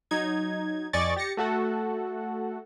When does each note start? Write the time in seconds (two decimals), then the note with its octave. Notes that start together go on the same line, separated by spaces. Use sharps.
0.11 F#3 D#4 G#6
0.93 F2 D5 D#5 G#5 C#6 A6
1.16 G4 A6 A#6 C#7
1.37 A3 F#4 A4 F#5